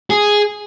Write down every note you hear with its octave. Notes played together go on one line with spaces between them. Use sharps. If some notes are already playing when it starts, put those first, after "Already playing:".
G#4